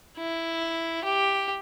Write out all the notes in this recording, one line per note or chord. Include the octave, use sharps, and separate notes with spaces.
E4
G4